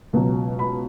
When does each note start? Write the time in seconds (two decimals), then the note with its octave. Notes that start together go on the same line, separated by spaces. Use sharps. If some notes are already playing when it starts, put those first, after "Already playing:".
0.13 C#2 B2 F#3
0.59 B5